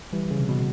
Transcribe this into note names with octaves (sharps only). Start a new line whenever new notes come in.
E3 G3
C#3
C3
B2